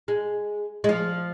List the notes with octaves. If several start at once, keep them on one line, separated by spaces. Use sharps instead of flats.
G#3
G#3
F3